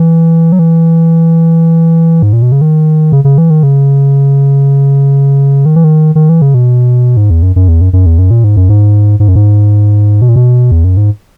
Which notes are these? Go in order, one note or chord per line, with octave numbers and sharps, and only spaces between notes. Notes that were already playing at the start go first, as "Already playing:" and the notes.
Already playing: E3
F#3
E3
G#2
A#2
B2
C#3
D#3
C#3
C#3
E3
D#3
C#3
D#3
E3
D#3
D#3
E3
C#3
B2
G#2
E2
F#2
F#2
E2
F#2
F#2
E2
F#2
A#2
G#2
F#2
G#2
G#2
F#2
G#2
B2
A#2
B2
E2
F#2
G#2